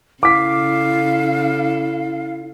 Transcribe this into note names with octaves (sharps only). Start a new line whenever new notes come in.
C#3 E4 A4 F5 D6 B6